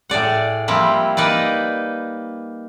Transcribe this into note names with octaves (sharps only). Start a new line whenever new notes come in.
A2 G#4 D5 F#5
F3 G3 A#3 C4 E4
A#3 D#4 B4 D5